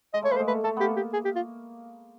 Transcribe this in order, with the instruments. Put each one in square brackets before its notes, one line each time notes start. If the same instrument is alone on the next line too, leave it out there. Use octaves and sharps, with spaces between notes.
[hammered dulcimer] G#3 [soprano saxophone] D#5
[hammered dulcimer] A3 [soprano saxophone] C#5
[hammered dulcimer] A#3 [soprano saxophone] B4
[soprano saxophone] C5
[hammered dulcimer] G#3
[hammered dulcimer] A3 [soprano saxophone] B4
[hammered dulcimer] A3 [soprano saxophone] A4
[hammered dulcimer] A#3 B3 [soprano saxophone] G4
[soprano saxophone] G4
G#4
G4
F4